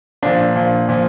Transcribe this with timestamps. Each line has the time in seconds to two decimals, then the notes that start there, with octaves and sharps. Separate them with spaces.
0.23 A#2 F3 D4
0.56 A#2 F3
0.89 A#2 F3